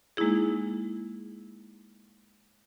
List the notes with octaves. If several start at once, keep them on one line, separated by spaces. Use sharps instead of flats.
G#3 A#3 D#4 E4 G#4